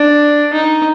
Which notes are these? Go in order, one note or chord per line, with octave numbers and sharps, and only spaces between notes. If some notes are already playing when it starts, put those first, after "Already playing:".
Already playing: D4
D#4